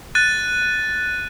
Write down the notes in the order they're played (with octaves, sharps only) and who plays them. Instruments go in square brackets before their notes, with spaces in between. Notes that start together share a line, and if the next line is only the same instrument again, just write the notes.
[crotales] F#6 A6 D#7